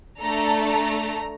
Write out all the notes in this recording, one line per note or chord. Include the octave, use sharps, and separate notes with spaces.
A3 D4 A4 A#5
A#5